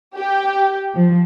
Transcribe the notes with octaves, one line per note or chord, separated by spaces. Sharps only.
G4
F3